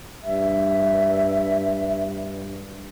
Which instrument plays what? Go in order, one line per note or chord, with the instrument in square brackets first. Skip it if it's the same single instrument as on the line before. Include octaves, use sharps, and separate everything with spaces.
[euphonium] G2 [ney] E5